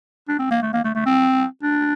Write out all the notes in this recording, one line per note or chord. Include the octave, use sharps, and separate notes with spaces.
D4
C4
A#3
A3
A#3
A3
A3
C4
D4